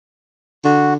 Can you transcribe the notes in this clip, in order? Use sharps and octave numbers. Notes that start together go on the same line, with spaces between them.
D3 F#4